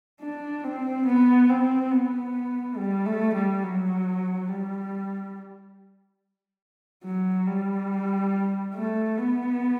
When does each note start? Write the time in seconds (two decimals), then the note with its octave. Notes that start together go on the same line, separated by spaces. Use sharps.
0.21 D4
0.64 C4
1.06 B3
1.49 C4
1.92 B3
2.78 G3
3.06 A3
3.34 G3
3.63 F#3
4.49 G3
7.05 F#3
7.48 G3
8.75 A3
9.18 B3